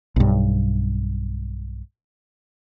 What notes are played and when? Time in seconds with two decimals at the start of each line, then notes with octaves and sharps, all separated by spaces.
0.16 B1 G2